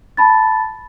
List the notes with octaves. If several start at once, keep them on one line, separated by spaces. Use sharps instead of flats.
A5 B5 A6